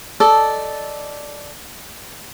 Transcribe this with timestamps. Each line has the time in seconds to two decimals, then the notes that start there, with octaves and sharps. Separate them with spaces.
0.20 A4 D5 D#5